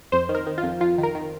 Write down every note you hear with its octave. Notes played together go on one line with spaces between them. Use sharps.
F2 C5
D#3
A#4
D#3
F4
F2
F2 F4
D#3
A#4
D#3